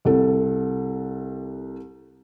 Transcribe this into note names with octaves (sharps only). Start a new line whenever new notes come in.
C2 A4